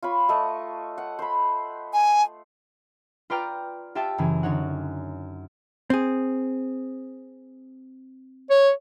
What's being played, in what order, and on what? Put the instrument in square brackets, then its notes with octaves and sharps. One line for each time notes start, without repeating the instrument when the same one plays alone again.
[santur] F4 C#5 B5
A3 A4 D#5
F#5
C5 B5
[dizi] G#5
[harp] F4 B4 D5 G5 A#5 F6
F4 G4 E5 G5 A5
F#2 C#3 E3
D3 D#4 C#5 F#5
[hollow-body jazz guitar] C4 G#4
[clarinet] C#5